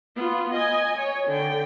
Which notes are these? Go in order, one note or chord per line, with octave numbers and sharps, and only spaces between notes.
B3 F4
D#5 G#5
C#5
D3 G5